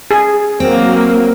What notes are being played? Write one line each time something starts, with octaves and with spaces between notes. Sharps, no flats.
G#4
F#3 A#3 C4